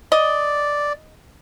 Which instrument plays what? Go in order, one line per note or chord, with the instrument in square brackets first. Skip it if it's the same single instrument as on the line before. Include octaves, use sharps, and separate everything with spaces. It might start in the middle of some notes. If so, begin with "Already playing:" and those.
[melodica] D5 [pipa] D#5